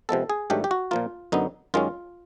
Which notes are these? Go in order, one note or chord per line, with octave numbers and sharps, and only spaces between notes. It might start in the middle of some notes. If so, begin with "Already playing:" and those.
C3 F3 G#3 B3 A4
G#4
G#2 D#3 F#3 A3 D4 G4
G4
F#4
A#2 F3 A#3 F4
F#2 D3 F#3 B3 D#4
F#2 D#3 G#3 C#4 F4